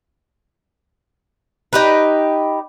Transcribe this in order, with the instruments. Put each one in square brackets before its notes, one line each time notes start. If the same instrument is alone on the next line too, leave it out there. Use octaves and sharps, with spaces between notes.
[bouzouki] D#4 G4 B4